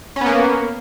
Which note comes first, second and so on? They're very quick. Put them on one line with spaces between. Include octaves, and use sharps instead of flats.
C#4 B3 A#3